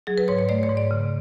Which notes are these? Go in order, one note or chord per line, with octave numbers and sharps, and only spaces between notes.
F#3 G#4
B4
G#2 C#5
C#5
A3 D5
C#5
G#2
D5
C#3